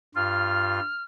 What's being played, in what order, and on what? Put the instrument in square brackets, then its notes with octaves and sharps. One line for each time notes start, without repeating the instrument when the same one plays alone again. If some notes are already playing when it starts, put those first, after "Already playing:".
[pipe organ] G2 F4 [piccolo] F6